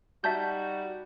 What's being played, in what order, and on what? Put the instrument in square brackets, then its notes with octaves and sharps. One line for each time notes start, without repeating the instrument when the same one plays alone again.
[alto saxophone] G3 [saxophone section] D#4 F#4 [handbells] E5 A5 G6